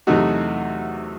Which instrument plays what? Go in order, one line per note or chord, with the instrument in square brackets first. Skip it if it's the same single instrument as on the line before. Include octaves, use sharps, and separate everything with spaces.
[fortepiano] E2 C3 F#3 A3 D#4 F#4